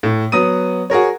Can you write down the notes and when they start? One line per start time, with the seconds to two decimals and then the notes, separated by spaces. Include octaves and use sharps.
0.03 A2
0.32 F#3 B3 D#6 D#7
0.90 F#4 G#4 A#4 C#5